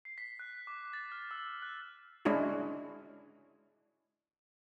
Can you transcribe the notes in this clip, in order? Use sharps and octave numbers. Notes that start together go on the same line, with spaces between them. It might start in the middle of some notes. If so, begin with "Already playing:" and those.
C7
B6
F#6
D6
A6
F6
E6
F#6
G#3 C#4 D4 E4 F#4